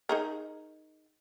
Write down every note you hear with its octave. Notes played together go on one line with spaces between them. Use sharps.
D#4 G#4 A#4